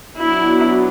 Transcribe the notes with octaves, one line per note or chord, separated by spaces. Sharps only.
F#3 B3 D4 E4